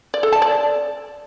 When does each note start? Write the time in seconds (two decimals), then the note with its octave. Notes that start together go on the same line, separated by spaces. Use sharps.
0.14 D5
0.23 A4
0.32 A5
0.42 D5